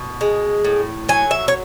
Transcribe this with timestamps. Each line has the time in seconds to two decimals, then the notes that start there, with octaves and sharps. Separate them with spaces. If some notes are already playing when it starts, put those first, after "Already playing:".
Already playing: B2
0.21 G#3
0.64 A2
1.09 F#3 G#5
1.31 E5
1.48 C#5